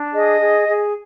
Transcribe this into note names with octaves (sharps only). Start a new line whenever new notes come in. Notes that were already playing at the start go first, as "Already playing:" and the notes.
Already playing: D4
G#4 D#5
G#4
G#4